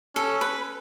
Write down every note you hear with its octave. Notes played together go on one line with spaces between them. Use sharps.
C#4 A4
B4